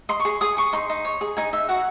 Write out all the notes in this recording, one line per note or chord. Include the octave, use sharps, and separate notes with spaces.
D#5 C6
C#6
G#4
G#4 D#6
G#4 C#6
D#4 C6
D#4
C#5
G#4
D#4 G#5
D#4 E5
F#4 F#5